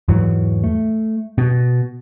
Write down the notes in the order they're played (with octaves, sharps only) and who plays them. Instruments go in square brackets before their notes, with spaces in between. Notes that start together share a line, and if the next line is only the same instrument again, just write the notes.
[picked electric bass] E2 G#2 E3 F#3
A3
B2